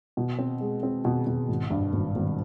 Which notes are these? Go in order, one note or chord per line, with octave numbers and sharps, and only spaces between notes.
B2
C4
G#3
C4
B2
B2
G#1
G2
G#1
G#1